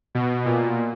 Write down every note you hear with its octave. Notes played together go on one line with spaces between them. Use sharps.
B2
A#2